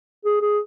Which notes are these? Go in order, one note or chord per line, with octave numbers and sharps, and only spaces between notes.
G#4
G#4